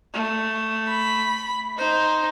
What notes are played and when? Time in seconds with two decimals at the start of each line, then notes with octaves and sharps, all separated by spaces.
0.14 A3
0.88 B5
1.78 D#4 C5